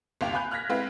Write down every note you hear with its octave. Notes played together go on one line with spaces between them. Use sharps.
G1 D#2 C3 F5 G5 F7
F5 G#5 B5 F#6 G6
F6 F#6 G#6 A#6 B6
G#3 B3 C4 E4 B4 F5